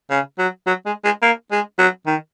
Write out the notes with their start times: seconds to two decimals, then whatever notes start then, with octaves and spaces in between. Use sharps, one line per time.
0.10 C#3
0.38 F#3
0.67 F#3
0.86 G#3
1.04 G#3
1.22 A#3
1.51 G#3
1.78 F#3
2.06 D#3